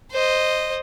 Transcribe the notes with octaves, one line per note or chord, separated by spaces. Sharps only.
C5 D#5